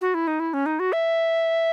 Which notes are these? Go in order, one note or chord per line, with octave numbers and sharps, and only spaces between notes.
F#4
E4
D#4
E4
C#4
D#4
F#4
E5